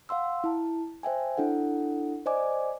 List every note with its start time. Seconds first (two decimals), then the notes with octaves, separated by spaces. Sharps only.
0.09 F5 F#5 C6 E6
0.44 E4 A5
1.03 C5 E5 G5 G#5
1.37 D4 E4 A4 F#5
2.26 C5 D5 D#5 G#5 D6